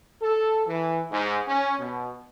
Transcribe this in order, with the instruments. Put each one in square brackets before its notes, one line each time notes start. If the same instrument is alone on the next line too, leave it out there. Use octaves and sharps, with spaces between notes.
[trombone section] A4
E3
G#2
C#4
B2